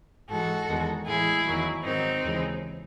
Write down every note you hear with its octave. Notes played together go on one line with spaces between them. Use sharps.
G#2 E3 G#3 F#4 A4
E2 D#3 G#3
A2 E3 G#3 E4 G#4
E2 D#3 F#3
G#2 D#3 F#3 C4 D#4
D#2 C#3 E3 G#3